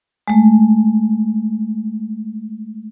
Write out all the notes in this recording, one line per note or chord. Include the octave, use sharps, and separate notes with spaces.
G#3 A3